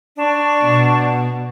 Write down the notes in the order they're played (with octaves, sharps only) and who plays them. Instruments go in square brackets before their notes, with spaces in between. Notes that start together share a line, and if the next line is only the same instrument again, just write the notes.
[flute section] D4 D5 C#6
[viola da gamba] B2